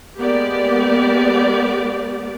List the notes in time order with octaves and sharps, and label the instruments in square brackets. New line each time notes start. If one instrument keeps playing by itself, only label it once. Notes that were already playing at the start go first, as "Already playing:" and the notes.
[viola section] G#3 A#3 B3 G4 D5